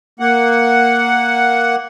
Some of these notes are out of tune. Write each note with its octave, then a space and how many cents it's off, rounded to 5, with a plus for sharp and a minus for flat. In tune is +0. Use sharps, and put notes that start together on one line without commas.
A#3 +0 F#5 +0